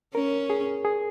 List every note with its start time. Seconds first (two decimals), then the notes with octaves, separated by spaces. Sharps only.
0.14 C#4 A#4
0.50 G#4
0.85 G#4